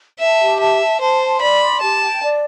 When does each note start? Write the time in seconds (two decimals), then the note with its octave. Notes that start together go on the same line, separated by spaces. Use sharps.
0.20 E5 A5
0.40 G4
0.60 E5 A5
0.81 A5
1.01 C5 A5
1.21 C6
1.41 D5 B5
1.61 C6
1.81 G4 A5
2.02 G5
2.22 D5